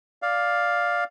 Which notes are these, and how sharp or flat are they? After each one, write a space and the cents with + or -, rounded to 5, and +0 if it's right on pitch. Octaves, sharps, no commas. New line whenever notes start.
D5 +0 F5 +5